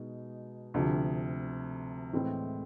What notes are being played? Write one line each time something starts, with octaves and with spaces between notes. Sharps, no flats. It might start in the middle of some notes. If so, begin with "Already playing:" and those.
Already playing: B2 G#3 D#4
D2 C3 F3
A2 E3 G#3 C4